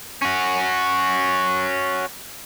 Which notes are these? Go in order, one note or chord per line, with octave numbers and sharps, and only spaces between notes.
C#4 F#4